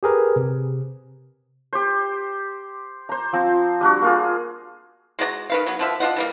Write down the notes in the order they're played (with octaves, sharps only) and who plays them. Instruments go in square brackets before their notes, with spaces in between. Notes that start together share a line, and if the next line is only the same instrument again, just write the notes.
[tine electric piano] G4 G#4 A#4 B4
C3
[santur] G4 C5
C5 A#5
F3 C4
G3 D4 F#4
A#3 F4 G#4
[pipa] G#3 F#4 D5 A#5
D#3 B4 F5
F#3 B3
D3 F3 E5
D4 F4 D#5 F#5
E3 G3 A#3